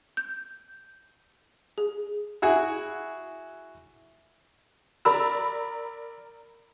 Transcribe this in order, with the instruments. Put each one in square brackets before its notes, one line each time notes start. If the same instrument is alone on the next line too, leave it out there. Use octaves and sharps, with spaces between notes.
[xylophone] G6
G#4
[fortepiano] E4 F#4 G#4
[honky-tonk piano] A#4 D5 A#5 B5 E6